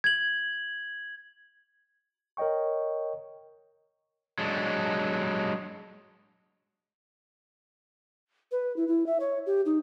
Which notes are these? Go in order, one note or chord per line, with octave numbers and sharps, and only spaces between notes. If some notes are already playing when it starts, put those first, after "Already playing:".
G#6 F#7
A#4 C#5 D#5 G5 C#6
F#3 G#3 D4
B4
E4
E4
E5
C#5
G4
D#4